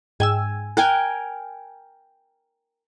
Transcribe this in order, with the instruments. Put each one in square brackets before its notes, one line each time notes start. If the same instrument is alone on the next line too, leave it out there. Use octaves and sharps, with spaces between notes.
[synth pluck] G#2 G5 E6 [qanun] G#5
[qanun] A#4 G5 G#5 [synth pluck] F#6